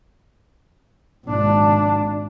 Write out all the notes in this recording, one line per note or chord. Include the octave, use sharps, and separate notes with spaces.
G#1 D4